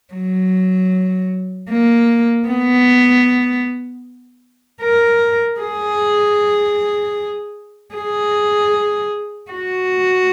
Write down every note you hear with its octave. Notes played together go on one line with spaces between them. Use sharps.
F#3
A#3
B3
A#4
G#4
G#4
F#4